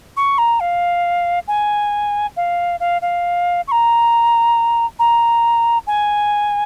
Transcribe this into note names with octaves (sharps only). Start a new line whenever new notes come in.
C#6
A#5
F5
G#5
F5
F5
F5
C#6
A#5
A#5
G#5